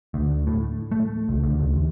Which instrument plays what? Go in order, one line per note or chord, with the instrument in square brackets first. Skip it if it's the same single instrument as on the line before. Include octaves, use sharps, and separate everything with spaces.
[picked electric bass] D2
A2
A3
C#2
D2
C#2
D#2